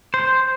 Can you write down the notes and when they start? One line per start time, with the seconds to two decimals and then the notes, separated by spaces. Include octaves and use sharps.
0.14 C5